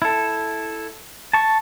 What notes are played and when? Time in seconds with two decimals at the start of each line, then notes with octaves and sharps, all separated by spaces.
0.02 E4 A4
1.33 A5 C#6